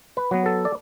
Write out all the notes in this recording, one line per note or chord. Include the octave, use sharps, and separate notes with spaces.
B4
F#3 B3
A4
D5